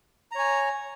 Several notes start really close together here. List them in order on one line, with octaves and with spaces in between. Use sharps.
A#5 C#5 G#5